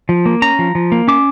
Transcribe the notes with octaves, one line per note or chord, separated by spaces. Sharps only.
F3
A#3
C#4 A#5
F3
F3
A#3
C#4 D6